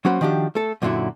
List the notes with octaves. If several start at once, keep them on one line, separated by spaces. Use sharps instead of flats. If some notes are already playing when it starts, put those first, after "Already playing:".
F#3 A#3 C#4 F#4 C5 B5
D#3 F3 D4 F#4 G4
A3 A4
F#2 A#2 D3 D4 E4 F#4